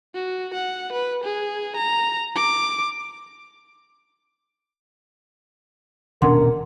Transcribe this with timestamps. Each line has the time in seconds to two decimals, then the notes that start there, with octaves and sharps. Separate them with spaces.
0.15 F#4
0.54 F#5
0.93 B4
1.24 G#4
1.77 A#5
2.35 D6
6.22 D#1 B2 C#4 D4 A#4 F#5 C6